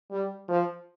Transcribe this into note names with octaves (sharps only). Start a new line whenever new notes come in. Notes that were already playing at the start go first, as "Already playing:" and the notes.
G3
F3